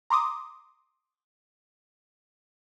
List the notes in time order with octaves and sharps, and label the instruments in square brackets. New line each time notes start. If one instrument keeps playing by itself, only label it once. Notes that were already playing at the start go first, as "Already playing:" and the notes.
[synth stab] A#5 C6 D6 D#6